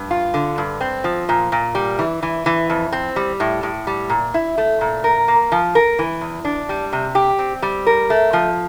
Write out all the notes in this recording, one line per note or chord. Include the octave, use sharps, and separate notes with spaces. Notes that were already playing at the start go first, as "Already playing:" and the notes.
Already playing: G2
F4
D3
G2
C4
F3
A#2
A#2
G3
E3
E3
E3
F2
C4
G3
A2
A2
G3
A#2
E4
A3
A#2
A#4
A#3
F3
A#4
E3
E2
D4
G3
C3
G4
C4
G3
A#4
A3
F3